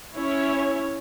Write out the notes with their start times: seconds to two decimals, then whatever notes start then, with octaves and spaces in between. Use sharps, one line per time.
0.15 C#4 E4 C#5